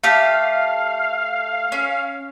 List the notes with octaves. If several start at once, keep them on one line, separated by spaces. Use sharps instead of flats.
A3 G4 F5
C#4